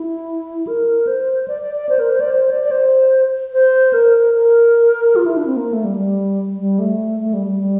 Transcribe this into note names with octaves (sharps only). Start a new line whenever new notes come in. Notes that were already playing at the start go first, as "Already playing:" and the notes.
Already playing: E4
A#4
C5
D5
D5
D5
C5
A#4
C5
D5
C5
D5
D5
C5
C5
A#4
A#4
F4
E4
D4
C4
A#3
A3
G3
G3
G3
A3
A3
G3
G3
G3